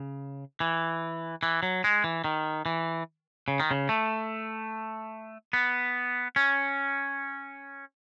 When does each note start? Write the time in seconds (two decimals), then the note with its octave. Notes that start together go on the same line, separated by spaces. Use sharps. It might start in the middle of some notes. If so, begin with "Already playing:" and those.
Already playing: C#3
0.60 E3
1.43 E3
1.63 F#3
1.84 G#3
2.04 E3
2.24 D#3
2.66 E3
3.48 C#3
3.60 D#3
3.71 C#3
3.89 A3
5.53 B3
6.36 C#4